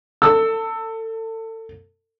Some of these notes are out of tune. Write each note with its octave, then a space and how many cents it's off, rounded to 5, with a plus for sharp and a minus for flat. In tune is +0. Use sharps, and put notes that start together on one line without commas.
A4 +30 E6 +0